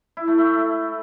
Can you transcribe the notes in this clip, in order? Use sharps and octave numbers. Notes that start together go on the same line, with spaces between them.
E4
A3
A3